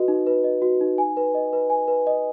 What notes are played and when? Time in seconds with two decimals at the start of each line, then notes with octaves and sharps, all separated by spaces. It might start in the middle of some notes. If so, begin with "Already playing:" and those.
Already playing: F#4 B4 D#5
0.08 D#4
0.27 B4
0.44 D#5
0.62 F#4
0.81 D#4
0.98 G#5
1.17 B4
1.34 D#5
1.53 B4
1.70 G#5
1.88 B4
2.07 D#5